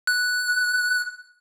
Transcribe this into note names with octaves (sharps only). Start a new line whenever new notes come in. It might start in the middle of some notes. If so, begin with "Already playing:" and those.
F#6